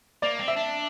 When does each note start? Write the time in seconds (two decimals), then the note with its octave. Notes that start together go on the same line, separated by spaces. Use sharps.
0.22 A#3 D5
0.39 C4
0.48 E5
0.56 D4